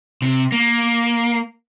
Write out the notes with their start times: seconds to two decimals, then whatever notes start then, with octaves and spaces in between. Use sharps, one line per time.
0.22 C3
0.52 A#3